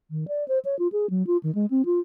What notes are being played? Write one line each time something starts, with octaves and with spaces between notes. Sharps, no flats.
D#3
D5
C5
C#5
F4
G#4
F#3
F4
D#3
G#3
C4
F4